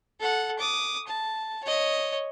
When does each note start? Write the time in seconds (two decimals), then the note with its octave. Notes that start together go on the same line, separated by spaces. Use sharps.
0.20 A4 F#5
0.59 D6 D#6
1.07 A5
1.64 C#5 D#5